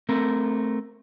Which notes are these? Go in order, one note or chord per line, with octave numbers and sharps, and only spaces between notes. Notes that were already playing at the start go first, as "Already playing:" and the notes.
A3 C4 A#4